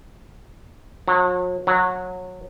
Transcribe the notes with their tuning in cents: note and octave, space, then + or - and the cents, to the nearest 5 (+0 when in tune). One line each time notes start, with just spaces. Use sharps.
F#3 -40
F#3 -20